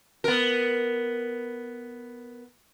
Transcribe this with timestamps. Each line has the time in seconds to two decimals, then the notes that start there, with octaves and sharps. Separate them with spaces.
0.24 B3 A#4